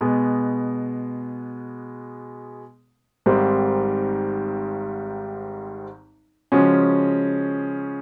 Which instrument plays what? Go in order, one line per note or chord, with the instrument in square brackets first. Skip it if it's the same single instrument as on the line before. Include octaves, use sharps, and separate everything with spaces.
[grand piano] B2 G#3 B3
G#1 G#2 D#3 G3 C4
C#3 F3 G#3 C#4 F#4